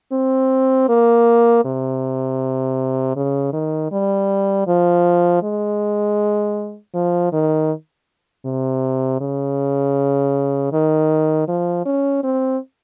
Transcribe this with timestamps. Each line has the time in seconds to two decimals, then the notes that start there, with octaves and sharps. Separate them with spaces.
0.12 C4
0.89 A#3
1.65 C3
3.16 C#3
3.53 D#3
3.92 G3
4.67 F3
5.42 G#3
6.94 F3
7.32 D#3
8.45 C3
9.21 C#3
10.72 D#3
11.48 F3
11.86 C#4
12.23 C4